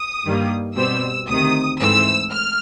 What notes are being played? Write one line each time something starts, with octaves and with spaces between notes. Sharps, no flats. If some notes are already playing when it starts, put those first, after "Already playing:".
Already playing: D#6
G2 D#3 G3 A#3
B2 G3 C4 E6
D2 C3 D#3 D#6
G#2 E3 A3 C4 E6
F6